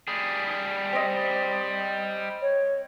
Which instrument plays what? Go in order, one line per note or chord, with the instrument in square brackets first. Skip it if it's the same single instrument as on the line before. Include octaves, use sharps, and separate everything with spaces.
[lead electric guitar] G3 G#4
[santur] C4 D#5
[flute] C#5